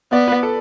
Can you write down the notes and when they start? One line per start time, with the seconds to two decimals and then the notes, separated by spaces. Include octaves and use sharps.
0.12 B3 D5
0.28 B4
0.43 A4